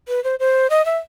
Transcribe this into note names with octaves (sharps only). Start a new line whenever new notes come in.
B4
C5
C5
D#5
E5